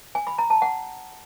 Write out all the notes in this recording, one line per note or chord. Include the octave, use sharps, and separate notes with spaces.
G#5
B5
A#5
A5
F#5